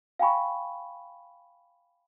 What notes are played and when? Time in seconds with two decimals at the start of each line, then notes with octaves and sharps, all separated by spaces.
0.19 F5 G5 G#5 B5 C#6